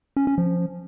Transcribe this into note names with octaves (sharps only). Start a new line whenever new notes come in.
C#4
C#4
F3